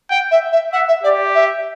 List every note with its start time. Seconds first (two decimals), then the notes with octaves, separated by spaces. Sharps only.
0.10 F#5 G5
0.31 E5
0.52 E5
0.73 E5 F#5
0.88 E5
1.03 G4 D5
1.35 E5